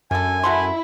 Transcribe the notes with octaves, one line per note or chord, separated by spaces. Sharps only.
F#2 D3 A4 G#5
E4 F#4 A4 C6